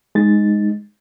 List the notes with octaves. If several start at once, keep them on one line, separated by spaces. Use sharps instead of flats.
G#3 D#4 A6